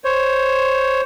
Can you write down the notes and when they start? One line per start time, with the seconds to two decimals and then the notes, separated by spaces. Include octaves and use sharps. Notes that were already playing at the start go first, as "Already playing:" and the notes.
0.04 C5 C#5